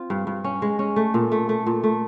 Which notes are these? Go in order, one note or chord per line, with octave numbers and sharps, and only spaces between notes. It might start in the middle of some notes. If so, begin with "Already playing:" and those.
Already playing: C4 F4
G2
G2
C#4
G#3
C#4
A3
A#2
A3
A3
A#2
A3